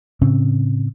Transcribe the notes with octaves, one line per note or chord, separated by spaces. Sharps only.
A2 C#3 C4 C#4